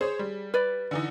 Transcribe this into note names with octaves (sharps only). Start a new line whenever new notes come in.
G#4 C5 C#5
G3
B4 D5
D3 E3 D#4